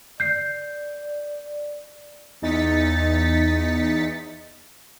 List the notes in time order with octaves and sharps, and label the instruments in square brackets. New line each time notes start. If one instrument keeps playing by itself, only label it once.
[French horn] D5 [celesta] G6 C7
[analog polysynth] E2 D#4 A6 B6 C#7